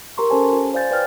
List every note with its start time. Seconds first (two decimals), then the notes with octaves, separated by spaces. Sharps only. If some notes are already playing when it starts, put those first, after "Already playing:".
0.17 G4 A#4 A#5 C6 C#6
0.30 C#4 G4 A4 C5 G#5 A5
0.53 F4
0.74 C5 D5 F5 G#5 G6 A6
0.91 B4 D5 G5 F6 G6 A6